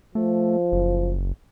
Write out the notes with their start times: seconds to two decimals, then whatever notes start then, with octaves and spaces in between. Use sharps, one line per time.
0.15 F3 A3
0.72 F#1